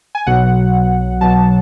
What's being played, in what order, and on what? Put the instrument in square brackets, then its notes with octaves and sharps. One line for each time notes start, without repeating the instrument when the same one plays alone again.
[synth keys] G#5
B1 B2 F#3 F#5
B1 B2 F#3 A5